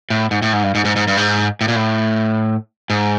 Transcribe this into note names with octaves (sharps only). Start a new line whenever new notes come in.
A2
G#2
A2
G#2
G2
G#2
G#2
G#2
G2
G#2
A2
A#2
A2
G#2